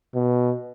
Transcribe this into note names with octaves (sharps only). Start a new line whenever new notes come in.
B2